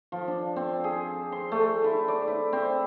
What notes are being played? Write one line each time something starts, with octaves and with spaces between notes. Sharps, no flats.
F3
D4
C4
G#4
C6
A3
E4
D5
E4
C4